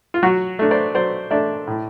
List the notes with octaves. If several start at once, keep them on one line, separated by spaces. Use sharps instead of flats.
F4
F#3 F#4
A3 D4
C5 D5
F#3 C5 D5
A3 D4 D5 E5
A2